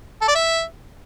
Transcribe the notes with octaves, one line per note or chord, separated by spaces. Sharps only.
A4
D5
E5